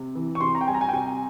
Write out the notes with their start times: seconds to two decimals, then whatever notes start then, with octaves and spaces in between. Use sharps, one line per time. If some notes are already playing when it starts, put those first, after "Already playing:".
Already playing: C3
0.15 E3
0.35 C#6
0.41 C3 C6
0.55 A#5
0.61 G5
0.68 G3 G#5
0.74 A#5
0.81 G#5
0.89 G5
0.93 C3 G#5